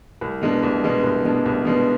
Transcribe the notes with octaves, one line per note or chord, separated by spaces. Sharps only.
C2
B2 G#3 B3 D4
C2
B2 G#3 B3 D4
C2
B2 G#3 B3 D4
C2
B2 G#3 B3 D4